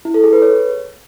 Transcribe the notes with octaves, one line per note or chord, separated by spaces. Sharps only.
E4
A4
G#4
B4
C#5